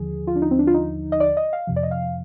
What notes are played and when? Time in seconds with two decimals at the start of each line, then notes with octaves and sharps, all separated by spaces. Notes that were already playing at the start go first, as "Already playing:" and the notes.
Already playing: D#2 D3 F3 G#4
0.27 F4
0.36 D4
0.42 D#4
0.51 C4
0.59 D4
0.67 F4
0.74 D#4
1.12 D#5
1.20 D5
1.37 D#5
1.53 F5
1.67 F2 C3 F3
1.76 D5
1.83 D#5
1.91 F5